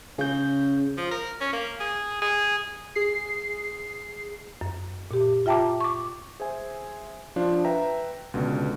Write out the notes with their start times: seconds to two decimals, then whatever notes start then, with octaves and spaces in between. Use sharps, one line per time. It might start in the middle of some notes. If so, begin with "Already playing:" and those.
0.18 C#3 C#4 G6
0.97 F3
1.11 A#4
1.40 C#4
1.53 A#3
1.80 G#4
2.21 G#4
2.95 G#4 C7
4.61 F#2
5.11 A#2 G4
5.46 F4 E5 G5 A5 A#5 D6
5.81 C#6 D6
6.40 G#4 C5 E5 G#5
7.36 F3 D4 F4
7.65 B4 E5 G5 A#5
8.34 C#2 B2 D3